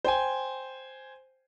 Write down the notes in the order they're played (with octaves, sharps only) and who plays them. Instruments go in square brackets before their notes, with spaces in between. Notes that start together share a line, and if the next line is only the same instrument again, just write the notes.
[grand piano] C5 G5 G#5